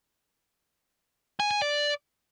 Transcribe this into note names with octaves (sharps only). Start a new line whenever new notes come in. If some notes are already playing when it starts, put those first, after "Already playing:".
G#5
G#5
D5